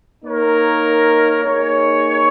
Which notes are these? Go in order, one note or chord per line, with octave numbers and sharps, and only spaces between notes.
A#3 D#4 A#4 C#5
A#3 D#4 G#4 C#5